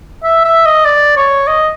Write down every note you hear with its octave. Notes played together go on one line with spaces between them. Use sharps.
E5
E5
D#5
D5
C#5
D#5